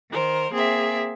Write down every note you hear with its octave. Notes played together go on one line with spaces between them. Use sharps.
D#3 A#4 C5
A#3 C4 G#4 E5